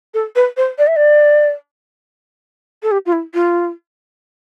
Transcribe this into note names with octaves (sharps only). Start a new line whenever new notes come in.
A4
B4
C5
D5
E5
D5
A4
G4
F4
E4
F4